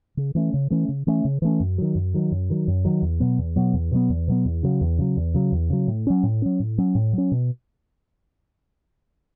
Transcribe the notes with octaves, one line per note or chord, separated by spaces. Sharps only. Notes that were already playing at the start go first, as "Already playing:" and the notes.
C#3
E3 A3 C#4
C#3
E3 A3 C#4
C#3
E3 A3 C#4
C#3
E3 A3 C#4
F#2
D#3 F#3
F#2
D#3 F#3
F#2
D#3 F#3
F#2
D#3 F#3
E2
B2 F#3 B3
E2
B2 F#3 B3
E2
B2 F#3 B3
E2
B2 F#3 B3
E2
C#3 F#3
E2
C#3 F#3
E2
C#3 F#3
E2
C#3 F#3
A2
F#3 C#4
A2
F#3 C#4
A2
F#3 C#4
A2
F#3 C#4
B2